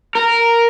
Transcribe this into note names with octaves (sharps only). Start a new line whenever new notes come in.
A#4